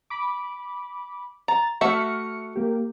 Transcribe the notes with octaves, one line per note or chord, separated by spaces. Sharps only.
B5 D6
A#5 A6
A3 F#4 E5 F6 C#7
A#3 G4